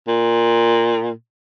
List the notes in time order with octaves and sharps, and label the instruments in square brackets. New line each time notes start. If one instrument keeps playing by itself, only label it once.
[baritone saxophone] A#2